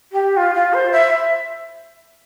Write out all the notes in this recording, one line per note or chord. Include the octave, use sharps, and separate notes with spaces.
G4
F4
F4
C5
E5